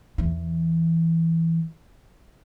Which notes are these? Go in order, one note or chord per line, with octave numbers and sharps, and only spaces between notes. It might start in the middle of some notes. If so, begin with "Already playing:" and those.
E2 E3